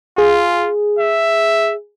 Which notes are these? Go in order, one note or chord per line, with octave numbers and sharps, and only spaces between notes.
F4 G#4
E5